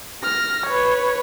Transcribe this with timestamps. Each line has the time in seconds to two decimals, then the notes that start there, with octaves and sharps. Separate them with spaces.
0.23 F6 A#6
0.66 B4 C#5